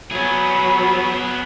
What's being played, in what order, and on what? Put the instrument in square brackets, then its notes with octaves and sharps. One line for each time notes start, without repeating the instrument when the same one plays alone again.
[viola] F#3 B5 [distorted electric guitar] B3 G#4